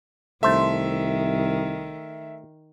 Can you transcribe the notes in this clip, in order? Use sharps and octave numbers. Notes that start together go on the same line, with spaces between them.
C2 D#3 A3 C5 E5